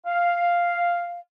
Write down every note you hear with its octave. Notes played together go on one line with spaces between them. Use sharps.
F5